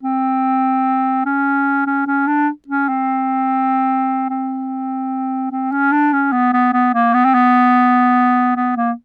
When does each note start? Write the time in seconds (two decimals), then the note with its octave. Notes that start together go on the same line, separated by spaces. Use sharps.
0.03 C4
1.26 C#4
1.87 C#4
2.07 C#4
2.27 D4
2.68 C#4
2.88 C4
4.30 C4
5.52 C4
5.72 C#4
5.92 D4
6.13 C#4
6.32 B3
6.53 B3
6.73 B3
6.94 A#3
7.14 B3
7.25 C4
7.34 B3
8.56 B3
8.76 A#3